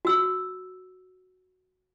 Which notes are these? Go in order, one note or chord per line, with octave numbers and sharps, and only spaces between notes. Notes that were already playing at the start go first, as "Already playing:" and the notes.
F#4 E6